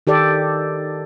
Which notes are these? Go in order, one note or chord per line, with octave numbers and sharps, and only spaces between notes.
D#3 G4 A4 D5